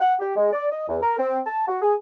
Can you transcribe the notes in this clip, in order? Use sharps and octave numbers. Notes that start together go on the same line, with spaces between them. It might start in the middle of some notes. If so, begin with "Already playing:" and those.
F#5
G4
G#3
D5
D#5
E2
A#4
C4
A5
F#4
G#4